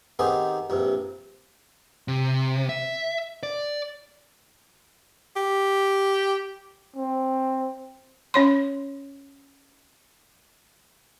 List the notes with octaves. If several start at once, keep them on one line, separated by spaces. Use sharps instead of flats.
D#3 B3 C4 D#4 G4 G#4
A#1 G2 C3
C3
E5
D5
G4
C4
C#4 C#5 C6